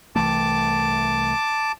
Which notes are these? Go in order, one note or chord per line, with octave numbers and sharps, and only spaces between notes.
C2 E3 A3 A5 D6